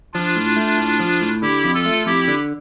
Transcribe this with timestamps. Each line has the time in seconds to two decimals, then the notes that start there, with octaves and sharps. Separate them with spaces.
0.14 F3 D4 F4
0.36 A2
0.56 A3
0.78 A2
1.00 F3
1.21 A2
1.42 D3 E4 G4
1.64 F2
1.75 F4 A4
1.86 A3
2.06 F2 E4 G4
2.28 D3